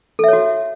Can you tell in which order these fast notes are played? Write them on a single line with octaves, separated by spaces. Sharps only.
A4 E5 C#5 F#4